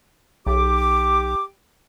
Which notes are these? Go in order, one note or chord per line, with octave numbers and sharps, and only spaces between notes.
B1 G4 D6